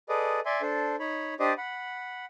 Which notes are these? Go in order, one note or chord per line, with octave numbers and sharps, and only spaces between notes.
G#4 A4 B4 D5 D#5
D5 E5 G#5 C6
D4 A4 C5
D#4 C#5 B5
D4 G4 C5 D5 D#5
F#5 B5